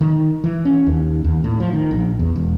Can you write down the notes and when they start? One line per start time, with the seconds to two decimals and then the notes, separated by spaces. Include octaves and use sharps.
0.01 D#3
0.44 E3
0.65 C#4
0.87 D#2
1.24 D#2
1.44 A2
1.60 F3
1.73 D#3
1.91 A#1
2.19 E2
2.36 E1